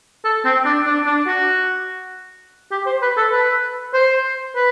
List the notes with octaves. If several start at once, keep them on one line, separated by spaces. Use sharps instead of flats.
A4
C4
D4
D4
D4
F#4
G4
C5
B4
A4
B4
C5
B4